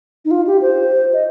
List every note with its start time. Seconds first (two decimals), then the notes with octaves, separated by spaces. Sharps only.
0.25 D#4
0.31 F4
0.47 G4
0.62 C5
1.13 D#5